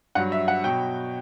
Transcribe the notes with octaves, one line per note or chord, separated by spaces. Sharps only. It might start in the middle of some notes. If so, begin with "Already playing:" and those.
G2 F#3 F#5
E5
F#5
B2 F#3 G5